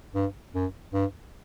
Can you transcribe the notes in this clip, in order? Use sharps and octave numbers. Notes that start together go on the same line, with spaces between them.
G2
F#2
G2